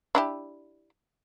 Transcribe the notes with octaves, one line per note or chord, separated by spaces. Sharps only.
D4 E4 G4